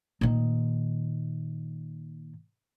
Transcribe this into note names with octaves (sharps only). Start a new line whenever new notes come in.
A#2 D#3